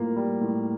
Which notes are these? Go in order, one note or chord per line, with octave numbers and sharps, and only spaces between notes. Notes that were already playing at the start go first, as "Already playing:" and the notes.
Already playing: A2 G3 A#3 F4
G3
A2